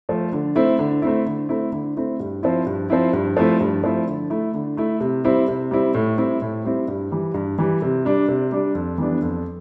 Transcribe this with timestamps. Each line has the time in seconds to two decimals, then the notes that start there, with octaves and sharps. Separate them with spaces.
0.09 F3 A3
0.33 D3
0.55 A3 C4 E4
0.79 D3
1.02 A3 C4 E4
1.26 D3
1.49 A3 C4 E4
1.72 D3
1.97 A3 C4 E4
2.20 G2
2.43 F3 C4 E4
2.66 G2
2.90 F3 C4 E4
3.13 G2
3.37 F3 A3 C4 E4
3.60 G2
3.83 F3 A3 C4 E4
4.07 D3
4.30 A3 E4
4.54 D3
4.77 A3 E4
5.00 C3
5.24 G3 C4 E4
5.48 C3
5.71 G3 C4 E4
5.94 A2
6.18 G3 C4 E4
6.42 A2
6.64 G3 C4 E4
6.88 G2
7.12 E3 G3
7.34 G2
7.58 E3 G3
7.82 C3
8.05 G3 D4
8.28 C3
8.52 G3 D4
8.75 F2
8.98 E3 G3 B3 D4
9.22 F2